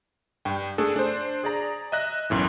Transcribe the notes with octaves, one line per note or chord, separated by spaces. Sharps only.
G2 G5
A3 D4 G#4 A4
D4 C5
G#4 D5 A#5
D#5 E5 F#6 A#6
B1 F#2 A2 E3